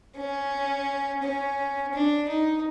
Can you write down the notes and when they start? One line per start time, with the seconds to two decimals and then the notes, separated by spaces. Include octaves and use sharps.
0.16 C#4
1.23 C#4
1.93 D4
2.29 D#4